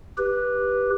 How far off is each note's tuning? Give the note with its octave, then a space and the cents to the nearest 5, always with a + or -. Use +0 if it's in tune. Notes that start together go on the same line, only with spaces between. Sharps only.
G4 +0 B4 -10